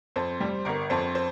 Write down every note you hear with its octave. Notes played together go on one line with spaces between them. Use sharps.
F2 C5
G3
G1 A#4
F2 C5
C5